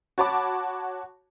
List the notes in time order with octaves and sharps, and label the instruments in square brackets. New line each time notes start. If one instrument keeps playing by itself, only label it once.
[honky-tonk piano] F#4 C#5 A5 B5 D6